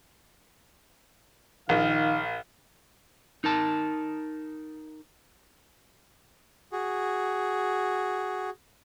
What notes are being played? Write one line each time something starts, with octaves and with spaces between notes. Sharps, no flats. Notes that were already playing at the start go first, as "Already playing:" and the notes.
A#1 D#3 F5
D#4 A#4 A5
F#4 G#4